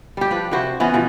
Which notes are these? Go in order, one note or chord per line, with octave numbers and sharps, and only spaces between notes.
G3 G4
F3 D4 B4
C3 E4 F#4 C5
E3 B3 C#4 F#4
G2 B2 E3 F3